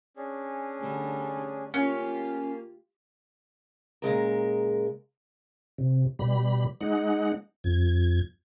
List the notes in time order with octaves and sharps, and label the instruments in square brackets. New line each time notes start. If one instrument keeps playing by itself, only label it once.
[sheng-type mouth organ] C#4 D4 G#4
[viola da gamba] D3 G3 A3
[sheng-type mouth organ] A#3 [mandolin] C#4 [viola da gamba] F4 G4
[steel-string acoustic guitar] A#2 C#3 G#3 A#4
[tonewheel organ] C3
B2 G3 B5
G#3 D#4 F#5
F2 G#6